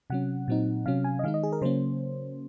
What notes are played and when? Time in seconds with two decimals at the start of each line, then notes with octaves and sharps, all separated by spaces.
0.10 C3 F#3 C#4 F#5
0.48 A#2 F#3 C4 D#4
0.86 C3 F#3 C#4 F5
1.04 G#5
1.19 D#5
1.24 D#3 G#3 D#4 F5
1.34 D#5
1.43 G#4
1.52 A#4
1.62 C#3 F#3 A#3 C#4 C5